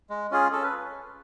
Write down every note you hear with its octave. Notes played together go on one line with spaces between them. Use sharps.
G#3
C#4 F4 G#4
C#4 A4
B4